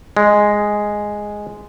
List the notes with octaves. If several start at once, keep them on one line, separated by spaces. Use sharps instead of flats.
G#3